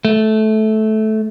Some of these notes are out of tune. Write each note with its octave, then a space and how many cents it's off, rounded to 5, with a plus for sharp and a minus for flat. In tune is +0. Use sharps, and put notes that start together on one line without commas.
A3 -15